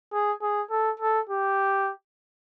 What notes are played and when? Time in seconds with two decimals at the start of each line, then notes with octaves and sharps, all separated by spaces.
0.12 G#4
0.42 G#4
0.70 A4
1.00 A4
1.29 G4